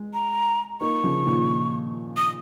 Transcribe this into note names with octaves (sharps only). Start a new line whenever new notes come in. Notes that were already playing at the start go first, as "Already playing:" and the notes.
Already playing: G#3
A#5
A#3 D#4 C#6
C#3 F3
A#2 D#3
D#6